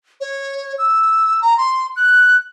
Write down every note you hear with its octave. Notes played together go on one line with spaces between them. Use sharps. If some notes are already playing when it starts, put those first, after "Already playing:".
C#5
E6
A#5
C6
F#6